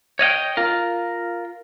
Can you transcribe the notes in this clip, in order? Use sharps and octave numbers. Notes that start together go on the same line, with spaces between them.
C#5 D#5 F5 G5
F4 A#4